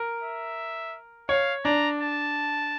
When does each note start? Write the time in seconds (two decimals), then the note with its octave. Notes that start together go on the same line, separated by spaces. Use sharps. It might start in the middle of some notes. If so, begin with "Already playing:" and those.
Already playing: A#4
0.23 E5
1.29 C#5 F5
1.64 D4 A#5
2.00 A5